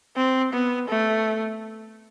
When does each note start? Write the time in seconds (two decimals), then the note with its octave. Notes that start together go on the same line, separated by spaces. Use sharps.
0.17 C4
0.53 B3
0.89 A3